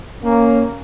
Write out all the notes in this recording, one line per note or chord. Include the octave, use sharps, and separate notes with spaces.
A#3 C#4